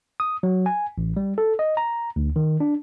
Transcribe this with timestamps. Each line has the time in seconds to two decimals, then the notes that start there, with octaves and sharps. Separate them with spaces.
0.20 D#6
0.43 F#3
0.66 G#5
0.98 A1
1.17 G3
1.38 A4
1.59 D#5
1.77 A#5
2.16 D2
2.36 D#3
2.60 D4